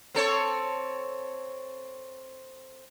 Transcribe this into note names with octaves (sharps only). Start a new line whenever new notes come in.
C4 A4 C#5